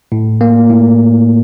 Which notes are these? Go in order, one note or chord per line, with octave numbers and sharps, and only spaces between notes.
A2
A#3
A2